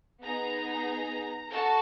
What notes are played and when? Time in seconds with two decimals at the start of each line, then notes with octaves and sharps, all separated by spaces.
0.23 B3 D#4 G#4 A#5
1.50 F#4 A4 A5